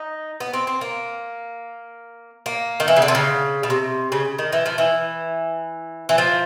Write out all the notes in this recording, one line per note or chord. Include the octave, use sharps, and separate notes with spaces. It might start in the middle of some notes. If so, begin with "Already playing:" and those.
Already playing: D#4
B3
C4
C4
A#3
A#3
D#3
E3
C#3
D3
C3
C#3
B2
C3
C#3
D#3
E3
F3
E3
E3
F3